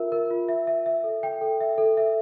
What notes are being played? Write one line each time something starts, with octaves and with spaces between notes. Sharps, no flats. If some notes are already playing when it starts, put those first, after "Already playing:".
Already playing: F4 A#4 E5
A#4
F4
E5
E5
E5
A4
G5
A4
E5
A4
E5